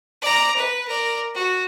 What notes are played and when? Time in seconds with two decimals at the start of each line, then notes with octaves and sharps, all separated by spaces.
0.22 D5 A#5
0.57 B4
0.88 A#4 D5
1.35 F#4